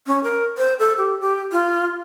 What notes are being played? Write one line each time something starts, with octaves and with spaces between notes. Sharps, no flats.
C#4
A#4
C5
A4
G4
G4
F4